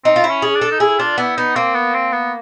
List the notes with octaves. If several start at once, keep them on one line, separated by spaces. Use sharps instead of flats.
C4 D#4
F4
E4
C#4
G#4
D4
A4
D#4
E4 G#4
D4 F4
B3 E4
B3 D#4
A#3 C4
B3
C4
B3